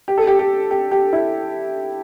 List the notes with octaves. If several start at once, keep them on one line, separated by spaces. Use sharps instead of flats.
G4
A4
G4
G4
G4
G4
E4